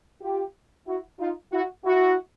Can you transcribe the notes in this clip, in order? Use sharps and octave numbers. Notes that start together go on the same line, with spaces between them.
F4 G4
E4 F#4
D#4 F4
E4 F#4
E4 F#4